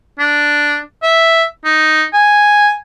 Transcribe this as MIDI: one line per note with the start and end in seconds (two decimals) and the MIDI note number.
0.19 0.80 62
1.03 1.45 76
1.65 2.04 63
2.14 2.75 80